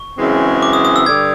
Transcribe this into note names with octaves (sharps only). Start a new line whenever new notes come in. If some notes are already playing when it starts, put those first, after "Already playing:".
Already playing: C#6
F#2 C#3 E3 G#3 C4
D6
D#6
D#6
E6
G2 D3 G3 G#6